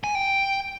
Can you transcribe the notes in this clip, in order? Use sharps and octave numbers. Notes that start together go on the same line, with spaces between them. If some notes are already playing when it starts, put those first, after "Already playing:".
G#5
G5